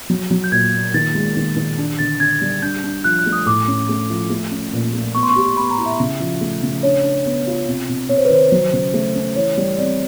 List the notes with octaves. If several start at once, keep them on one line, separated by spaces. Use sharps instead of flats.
F#3
F#3
G6
A#2 G#6
A#3
D#3 A6
G#3
D#3
D#3
D4
D3 A6
D4 G#6
G3
D4 G6
D4
F3 F#6
F#6
A3
D#6
A2 D6
C#4
A3
F3
A3
C#4
A#2
A3
B3 C#6
C6
C#6
G4
B3 B5
A#5
E4
E5
C#3
F3
A3
C#3
D4 C#5
D4
B3
F4
C3
C3
C3 C#5
C5
B4
D#3 C5
F#3
C#3
A3
C#4
E3 C#5
G3
C4 D5